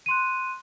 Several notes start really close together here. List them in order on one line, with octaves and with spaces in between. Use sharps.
D#7 C6 F#6